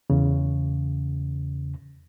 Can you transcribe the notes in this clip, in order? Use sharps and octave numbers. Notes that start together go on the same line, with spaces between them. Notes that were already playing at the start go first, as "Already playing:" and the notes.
E2 C#3